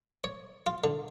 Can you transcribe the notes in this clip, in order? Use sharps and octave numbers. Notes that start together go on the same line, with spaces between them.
C#5
F4
D3